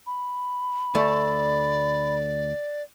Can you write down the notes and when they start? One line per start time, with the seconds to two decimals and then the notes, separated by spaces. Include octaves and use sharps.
0.07 B5
0.95 D2 A3 D5